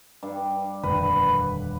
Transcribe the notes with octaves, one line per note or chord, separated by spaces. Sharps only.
G2
D#1 F2 D3 B4